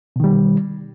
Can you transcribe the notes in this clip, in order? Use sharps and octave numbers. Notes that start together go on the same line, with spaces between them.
B2 D#3 G3